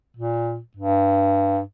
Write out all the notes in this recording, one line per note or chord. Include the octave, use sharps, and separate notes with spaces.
A#2
G2